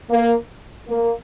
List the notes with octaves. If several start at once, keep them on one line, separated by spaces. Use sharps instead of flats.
A#3
A#3